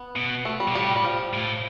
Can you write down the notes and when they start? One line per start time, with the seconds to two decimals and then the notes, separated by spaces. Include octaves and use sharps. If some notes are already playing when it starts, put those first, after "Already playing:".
Already playing: B3
0.16 B2
0.45 A3
0.60 G3
0.68 B2
0.75 A2 G3
0.96 G3
1.04 F3
1.33 A2